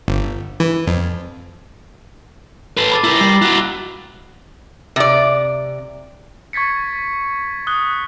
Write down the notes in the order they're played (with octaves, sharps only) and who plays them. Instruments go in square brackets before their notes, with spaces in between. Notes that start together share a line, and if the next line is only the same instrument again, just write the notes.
[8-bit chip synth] G1
E3
F2
[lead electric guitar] A4 B4 [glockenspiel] C7
[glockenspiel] B5 D6 A6
[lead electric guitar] E4 A#4 [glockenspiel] A#5 A#6
[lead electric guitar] G3 [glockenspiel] C7 F#7
[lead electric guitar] E4 F#4 [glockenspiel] F#6 F7
[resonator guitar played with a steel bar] C3 D5
[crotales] C#6 G#6 A6 B6 C#7
D#6 F#6 G7